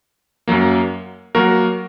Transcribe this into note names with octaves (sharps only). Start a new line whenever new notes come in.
F#2 F#3 A#3
F#3 A#3 F#4 A#4